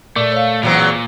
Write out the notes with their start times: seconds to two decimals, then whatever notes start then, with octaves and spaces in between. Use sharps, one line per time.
0.16 A#2 A3 D5
0.32 C#5 F5
0.63 E2 A#2 F#3 C4